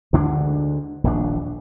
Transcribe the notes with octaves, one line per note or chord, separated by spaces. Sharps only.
D2 D3 G#3 D4
D#1 A#1 D4